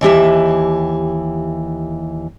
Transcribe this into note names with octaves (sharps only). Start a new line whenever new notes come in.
D#2 E3 G4 E5